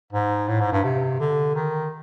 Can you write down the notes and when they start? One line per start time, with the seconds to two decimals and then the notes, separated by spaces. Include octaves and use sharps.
0.13 G#2
0.48 A2
0.61 G#2
0.72 G2
0.84 C3
1.20 D3
1.55 D#3